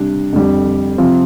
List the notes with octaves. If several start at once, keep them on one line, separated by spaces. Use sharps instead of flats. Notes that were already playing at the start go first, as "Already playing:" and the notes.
Already playing: C3 G3 D4
F2 D3 G3
C3 F3 C4 F4